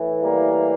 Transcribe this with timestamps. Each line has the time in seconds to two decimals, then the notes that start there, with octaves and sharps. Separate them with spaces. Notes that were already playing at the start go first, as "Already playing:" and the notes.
Already playing: A2 E3
0.22 G3 A#3